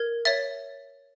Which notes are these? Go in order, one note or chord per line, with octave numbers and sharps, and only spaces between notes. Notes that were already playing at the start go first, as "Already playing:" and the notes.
Already playing: A#4 G#6
C#5 E5 A6